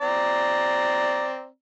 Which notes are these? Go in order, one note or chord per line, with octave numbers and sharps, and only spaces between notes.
C4 D5 A#5